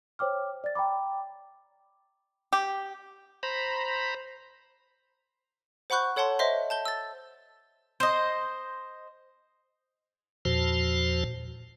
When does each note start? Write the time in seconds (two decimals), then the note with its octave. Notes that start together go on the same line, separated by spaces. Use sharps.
0.19 C5 C#5 G5 D6 F6
0.64 D5 A6
0.75 G5 A#5 B5 D6
2.53 G4
3.43 C5 A#5 B5
5.90 C5 F#5 B5 C#6 F#6 G6
6.16 A4 C#5 F#5 A5 C6
6.39 C5 D#5 E5 C6
6.70 A5 G6 G7
6.85 E6 A6
8.00 C5 D#5
10.45 E2 A#2 F3 F#4 C5 A5